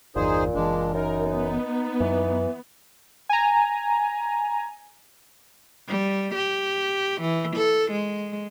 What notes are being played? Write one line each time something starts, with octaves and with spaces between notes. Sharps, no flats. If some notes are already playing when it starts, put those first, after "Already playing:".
G1 E2 A#2 D#4 G#4 C5
F#1 E3 G#3 D4
F#2 D#4 A#4
B3
F#2 E3
G#5 A#5
G3
G4
E3
A4
G#3